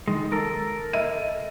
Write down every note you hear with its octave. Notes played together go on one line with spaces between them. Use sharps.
D#3 G#3
A4 A#4
D#5 E5 D#7